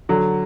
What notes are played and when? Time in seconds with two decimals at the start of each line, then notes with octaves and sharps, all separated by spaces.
0.09 D3 F#3